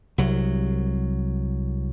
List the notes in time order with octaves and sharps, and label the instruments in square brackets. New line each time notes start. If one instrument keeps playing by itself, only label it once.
[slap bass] C2 F#3